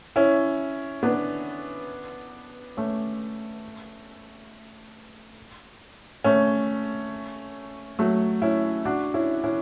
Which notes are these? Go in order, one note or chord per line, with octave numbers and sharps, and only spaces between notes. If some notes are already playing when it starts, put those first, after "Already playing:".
C#4 E4
B3 D4
A3 C#4
A3 C#4
F#3 A3
C#4 E4
D4 F#4
C#4 E4
C#4 E4